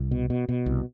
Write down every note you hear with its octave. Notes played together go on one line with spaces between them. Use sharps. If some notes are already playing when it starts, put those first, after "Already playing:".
Already playing: C2
B2
B2
B2
C2